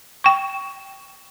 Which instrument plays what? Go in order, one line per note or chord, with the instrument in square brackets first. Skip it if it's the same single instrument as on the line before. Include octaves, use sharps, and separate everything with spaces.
[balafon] G5 C#6